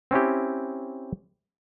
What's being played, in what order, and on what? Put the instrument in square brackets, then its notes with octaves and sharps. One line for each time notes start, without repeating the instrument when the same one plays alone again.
[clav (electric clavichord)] C4 C#4 E4 G4